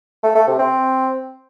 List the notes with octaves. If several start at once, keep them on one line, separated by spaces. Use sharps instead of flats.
A3
A3
C3
C4